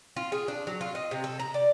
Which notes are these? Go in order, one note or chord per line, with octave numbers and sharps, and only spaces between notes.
F4
G#4
D4
F#3
F4
D#5
C3
A4
A#5
D5